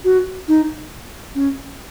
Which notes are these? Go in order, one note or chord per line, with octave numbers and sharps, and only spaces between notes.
F#4
D#4
C#4